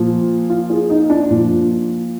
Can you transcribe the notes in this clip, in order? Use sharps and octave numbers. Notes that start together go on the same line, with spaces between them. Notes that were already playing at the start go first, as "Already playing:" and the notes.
Already playing: A#2 F3
F4
G#4
D#4
D4
A#2 F3